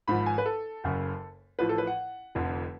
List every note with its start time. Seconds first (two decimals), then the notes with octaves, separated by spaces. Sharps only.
0.07 G#1 G#2 F3 B5
0.26 G#5
0.38 B4
0.46 A4
0.84 F#1 F#2 C#3
1.59 A1 A2 F3 B4
1.69 A4
1.78 B4
1.87 F#5
2.35 F1 F2 D3 F3